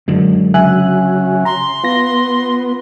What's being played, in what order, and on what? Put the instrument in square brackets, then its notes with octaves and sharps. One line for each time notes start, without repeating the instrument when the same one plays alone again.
[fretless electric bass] F#2 D3 [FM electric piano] G#3
[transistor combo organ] C#3 F#3 [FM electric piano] E5 G#5 F#6
[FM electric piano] A#5 [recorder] C6
[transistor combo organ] B3 [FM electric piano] F4 A#6